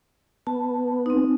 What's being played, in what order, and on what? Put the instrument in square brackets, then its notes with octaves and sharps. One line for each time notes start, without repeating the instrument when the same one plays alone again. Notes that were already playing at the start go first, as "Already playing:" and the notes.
[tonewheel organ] B3 [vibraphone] A5
[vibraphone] C4 D#4